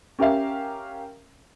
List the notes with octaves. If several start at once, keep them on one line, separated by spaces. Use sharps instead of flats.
C#4 G4 A#4 E5 F5